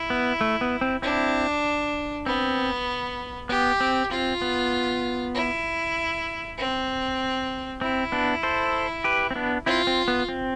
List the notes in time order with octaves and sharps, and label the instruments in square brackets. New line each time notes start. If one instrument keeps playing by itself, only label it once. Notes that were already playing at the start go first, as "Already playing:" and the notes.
Already playing: [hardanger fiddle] E4
[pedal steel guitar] B3
A3
B3
C4
[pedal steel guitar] C4 E4 [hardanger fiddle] D4
[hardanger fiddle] B3 [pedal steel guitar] C4
[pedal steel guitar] B3 [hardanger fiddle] G4
[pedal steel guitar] C4
[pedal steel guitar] C4 [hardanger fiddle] F4
[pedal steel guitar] B3
[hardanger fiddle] E4
C4
[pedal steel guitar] C4 [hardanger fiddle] E4
[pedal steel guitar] B3 D4
A4 C5
G4 B4
C4
B3 D4
[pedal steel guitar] C4 E4 [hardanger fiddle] F4
[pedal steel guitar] C4
B3
C4